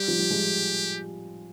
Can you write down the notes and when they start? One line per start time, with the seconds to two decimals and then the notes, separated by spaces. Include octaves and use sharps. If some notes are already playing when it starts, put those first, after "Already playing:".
Already playing: G3 G4
0.08 F3
0.19 G3
0.30 F3 G#3